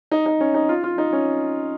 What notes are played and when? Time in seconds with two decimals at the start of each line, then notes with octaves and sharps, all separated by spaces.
0.11 D#4
0.26 D#4
0.40 C#4
0.54 D#4
0.69 F4
0.84 F4
0.98 D#4
1.13 C#4